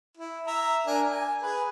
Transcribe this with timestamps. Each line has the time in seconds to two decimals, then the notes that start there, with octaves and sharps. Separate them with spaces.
0.18 E4
0.47 E5 A#5
0.87 D4 A#4 G#5
1.10 G#5
1.43 G#4 B4